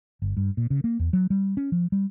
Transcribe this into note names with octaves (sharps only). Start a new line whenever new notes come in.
G1
G2
A#2
C#3
A#3
E2
F#3
G3
C#4
F3
G3